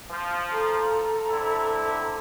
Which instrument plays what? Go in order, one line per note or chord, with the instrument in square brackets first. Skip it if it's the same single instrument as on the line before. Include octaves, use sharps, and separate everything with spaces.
[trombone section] F3
[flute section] A4 A#5
[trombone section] D3 C4 E4